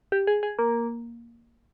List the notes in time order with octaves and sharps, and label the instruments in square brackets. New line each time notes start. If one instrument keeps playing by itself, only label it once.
[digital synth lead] G4
G#4
G#4
A#3